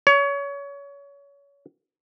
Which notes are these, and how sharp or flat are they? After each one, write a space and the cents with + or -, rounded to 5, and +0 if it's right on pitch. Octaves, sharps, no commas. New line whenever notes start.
C#5 +25